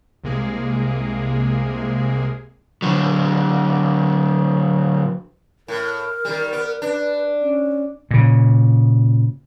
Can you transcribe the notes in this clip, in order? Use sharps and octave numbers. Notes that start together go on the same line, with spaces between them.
C2 C3 G#3 A#3 G#4
D3 F#3
A2 A#4
D#3 G3
B3
D4 B4
C#4
A#2 C#3